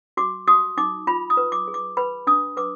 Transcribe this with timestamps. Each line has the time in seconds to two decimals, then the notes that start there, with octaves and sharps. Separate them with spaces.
0.17 F#4 D6
0.47 F#4 D#6
0.78 D#4 D6
1.07 F4 B5
1.30 D#6
1.37 B4
1.52 D6
1.68 G#4
1.74 D6
1.97 B4 B5
2.27 D4 D#6
2.57 B4 D6